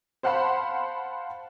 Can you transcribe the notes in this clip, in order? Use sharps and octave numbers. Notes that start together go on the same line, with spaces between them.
C5 F5 F#5 A5 B5 C6